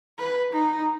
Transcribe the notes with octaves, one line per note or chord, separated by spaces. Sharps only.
B4
D#4